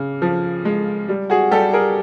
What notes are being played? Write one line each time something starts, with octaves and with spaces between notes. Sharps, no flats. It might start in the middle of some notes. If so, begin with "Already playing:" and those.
Already playing: C#3
F3
G#3
G3
F#4 G#4
G3 G4 A4
G#4 A#4